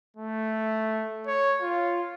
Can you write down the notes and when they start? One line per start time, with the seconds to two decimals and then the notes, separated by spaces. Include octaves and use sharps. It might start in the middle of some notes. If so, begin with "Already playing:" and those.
0.17 A3
1.27 C#5
1.62 F4